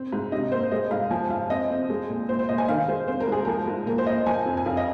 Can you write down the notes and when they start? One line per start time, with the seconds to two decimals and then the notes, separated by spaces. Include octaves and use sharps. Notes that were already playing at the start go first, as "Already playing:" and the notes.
Already playing: C4
0.13 G#2
0.32 C3 D#5
0.52 A#3 C5
0.72 G#3 D#5
0.91 G#2 F5
1.11 F3 G#5
1.30 F3 F5
1.50 C4 D#5
1.70 C4
1.90 G#3
2.10 A#2
2.29 A#2 C5
2.39 C5
2.49 A#2 D#5
2.58 G#5
2.68 D#3 F5
2.88 G#3 C5
3.08 C4 C5
3.20 A#4
3.28 G#2 G#4
3.45 F3 A#4
3.68 G#2
3.86 A#2 A#4
3.98 C5
4.07 A#3 D#5
4.26 F3 G#5
4.46 F2
4.57 G#5
4.66 F2 F5
4.77 D#5